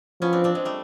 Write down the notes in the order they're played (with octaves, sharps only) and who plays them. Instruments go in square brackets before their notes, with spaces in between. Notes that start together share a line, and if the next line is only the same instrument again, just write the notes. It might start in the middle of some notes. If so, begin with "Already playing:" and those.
[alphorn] F3 [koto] B3 C#4
[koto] C4 D4
C4 D4
G#3
G3 A3